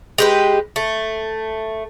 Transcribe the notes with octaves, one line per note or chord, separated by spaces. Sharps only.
G#3 G4 B4
A3